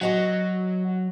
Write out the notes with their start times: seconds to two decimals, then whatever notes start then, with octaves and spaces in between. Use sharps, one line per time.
0.01 F#3 F#4 D#5 F#5